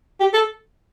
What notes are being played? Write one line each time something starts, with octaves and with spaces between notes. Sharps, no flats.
G4
A4